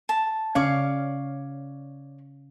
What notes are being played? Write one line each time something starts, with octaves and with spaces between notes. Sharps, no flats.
A5
C#3 C#4 C#5 D5 F5 C#6